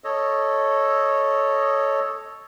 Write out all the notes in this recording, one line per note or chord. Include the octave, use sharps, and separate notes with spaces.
A4 C#5 D#5